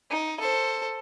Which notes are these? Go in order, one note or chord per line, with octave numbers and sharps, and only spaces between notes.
D#4
A4 C5